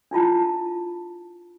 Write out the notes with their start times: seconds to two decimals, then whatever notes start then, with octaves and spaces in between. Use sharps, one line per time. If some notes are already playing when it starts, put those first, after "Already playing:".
0.11 D4 E4 F4 A5